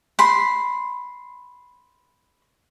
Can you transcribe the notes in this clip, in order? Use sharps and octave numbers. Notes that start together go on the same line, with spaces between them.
B5 C6